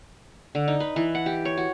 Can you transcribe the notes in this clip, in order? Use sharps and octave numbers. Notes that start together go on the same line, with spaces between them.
D3
D#4
B4
E3
F#5
G4
C#5
F#4